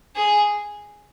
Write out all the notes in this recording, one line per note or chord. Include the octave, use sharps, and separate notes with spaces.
G#4